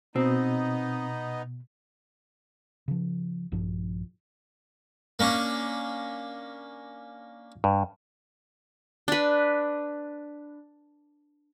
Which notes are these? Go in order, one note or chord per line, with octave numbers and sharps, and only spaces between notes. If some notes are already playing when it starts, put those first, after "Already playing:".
B2 B3 C4 D#4
C#3 F3
A#1 G2 F3
A#3 C#4 D4
G2
D4 B4